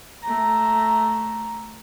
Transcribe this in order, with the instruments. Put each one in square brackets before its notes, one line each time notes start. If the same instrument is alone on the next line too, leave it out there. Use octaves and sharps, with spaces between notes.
[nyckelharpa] A3 A#5